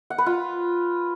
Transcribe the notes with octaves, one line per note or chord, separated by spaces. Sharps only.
F#5
B4
F4